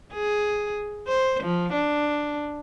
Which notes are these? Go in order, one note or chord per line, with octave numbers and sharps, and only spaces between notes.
G#4
C5
F3
D4